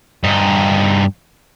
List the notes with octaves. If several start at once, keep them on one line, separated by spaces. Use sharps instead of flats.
G2 D#4